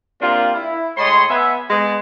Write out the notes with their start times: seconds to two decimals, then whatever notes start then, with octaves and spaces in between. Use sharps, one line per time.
0.22 C3 A#3 D4 F4
0.55 E4
0.97 A2 G#3 C#5 D#5 C6
1.30 B3 E5 G#5
1.70 G#3 B3